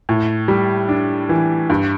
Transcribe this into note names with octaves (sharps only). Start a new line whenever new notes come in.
A2
G3
D4
E3
G2